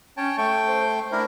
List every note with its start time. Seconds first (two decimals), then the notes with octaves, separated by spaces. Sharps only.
0.17 C#4 C#5 G5 A5
0.38 A3 G5 C#6
0.68 C5
1.12 A3 D4 E4 A#4